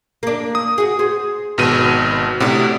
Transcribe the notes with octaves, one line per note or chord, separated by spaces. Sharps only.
A#3 D4
D#6
F#4 G#4
G#4 C5
G#1 B2 D#7
A2 C3 D4 F#4